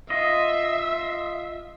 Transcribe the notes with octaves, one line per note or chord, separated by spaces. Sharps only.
F4 D#5 E5